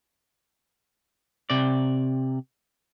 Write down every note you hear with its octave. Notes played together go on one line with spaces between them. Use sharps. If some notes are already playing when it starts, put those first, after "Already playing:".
C3 D5